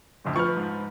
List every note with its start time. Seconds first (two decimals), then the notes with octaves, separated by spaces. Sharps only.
0.25 D1 G1 F2
0.36 F3 B4 C#6 F6
0.56 G#2